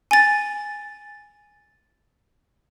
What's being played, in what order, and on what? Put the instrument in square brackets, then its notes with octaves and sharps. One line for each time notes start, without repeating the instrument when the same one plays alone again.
[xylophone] G#5 A6